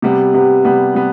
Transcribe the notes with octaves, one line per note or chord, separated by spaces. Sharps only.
C3 G3 B3
C3 G3 B3
C3 G3 B3
C3 G3 B3